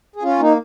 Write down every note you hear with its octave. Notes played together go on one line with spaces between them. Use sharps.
G#4
C#4 F4
A#3 D#4